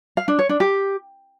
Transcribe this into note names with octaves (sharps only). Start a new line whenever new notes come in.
F5
D4
C#5
D4
G4